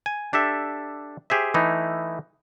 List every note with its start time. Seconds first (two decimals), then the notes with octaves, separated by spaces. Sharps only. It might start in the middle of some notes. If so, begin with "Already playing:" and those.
0.06 G#5
0.33 D4 G4 A4 E5
1.30 G4 G#4 C5 E5
1.54 E3 A3 D#4 E4